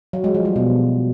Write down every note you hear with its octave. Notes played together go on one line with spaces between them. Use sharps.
F#3
G#3
F3
G3
B2